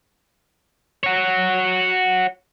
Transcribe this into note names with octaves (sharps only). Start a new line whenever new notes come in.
F#4 C#5